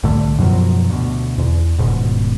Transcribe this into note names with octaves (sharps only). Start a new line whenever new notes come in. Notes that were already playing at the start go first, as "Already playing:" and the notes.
C2 A2 D3 A3
F#2 B2 F3 F#3
D2 B2
E2
D#1 G#2 B2